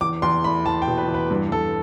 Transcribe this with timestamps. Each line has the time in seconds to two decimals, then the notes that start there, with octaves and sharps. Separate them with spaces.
0.01 E2 D6
0.22 E2 C6
0.44 A3 B5
0.66 E2 A5
0.82 G5
0.88 B2
0.98 B4
1.08 E2
1.14 B4
1.31 G2
1.51 G2 A4